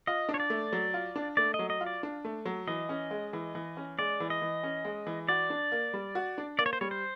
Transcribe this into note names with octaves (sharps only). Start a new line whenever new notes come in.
F4 D#5
D4
C#5
D5
A3
F#3
F4
D4
A3 D5
D#5
F#3
D#5
F4
D5
D4
A3
F#3
E3 D#5
C#4
G#3
E3
E3
C#4
G#3 D5
E3
D#5
E3
C#4
G#3
E3
F#4 D5
D4
A#3
G3
F#4
D4
A#3 D5
C#5
C5
G3 C#5
C5